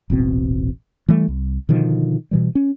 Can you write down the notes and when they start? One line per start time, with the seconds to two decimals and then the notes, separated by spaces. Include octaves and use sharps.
0.10 D#1 A1 B2 C4
1.09 E3 G3 A3
1.28 C2
1.69 B2 D3 D#3 F3
2.31 B2 E3 G3
2.55 C#4